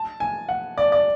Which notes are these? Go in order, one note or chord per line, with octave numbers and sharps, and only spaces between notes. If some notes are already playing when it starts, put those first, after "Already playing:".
Already playing: A5
G#5
F#5
D5
D5